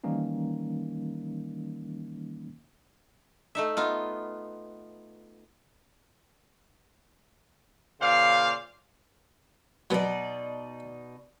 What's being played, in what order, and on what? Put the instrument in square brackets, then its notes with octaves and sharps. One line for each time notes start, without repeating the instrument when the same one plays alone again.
[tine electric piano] D#3 E3 G3 A#3 C#4 D#4
[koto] A3 D#4 E5
B3 D#4 F4
[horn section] A#2 C#3 C5 D5 F5
[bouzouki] B2 D#4 D5 [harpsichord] F#3 B3